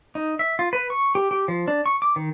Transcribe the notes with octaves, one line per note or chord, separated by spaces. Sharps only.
D#4
E5
F4
B4
C#6
G4
G4
F3
D4
C#6
D6
D#3